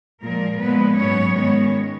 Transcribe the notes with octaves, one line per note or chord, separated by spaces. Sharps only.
A#2 F3 G#3 A#3 A#4
A#2 F3 G#3 B3 B4
G#2 F#3 B3 C#4 C#5
G#2 D#3 G#3 B3 C#4 C#5